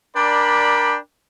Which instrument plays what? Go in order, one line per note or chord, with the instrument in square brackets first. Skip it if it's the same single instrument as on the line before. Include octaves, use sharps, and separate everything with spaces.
[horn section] D4 A#4 D5 G5 B5